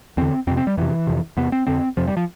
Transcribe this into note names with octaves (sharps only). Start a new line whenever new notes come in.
E2 D3 C4
F2 C3 C4
C4
G3
F2 C3 E3
F2 C3
E2 C3 B3
C4
F2 D3 C4
F2 C3 F3
G3
F3